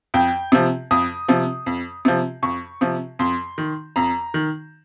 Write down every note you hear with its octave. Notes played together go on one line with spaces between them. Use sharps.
F2 G5
C3 F3
F2 D#6
C3 F3
F2
C3 F3
F2 C#6
C3 F3
F2 C6
D#3
F2 A#5
D#3